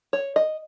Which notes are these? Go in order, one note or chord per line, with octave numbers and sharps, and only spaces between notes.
C#5
D#5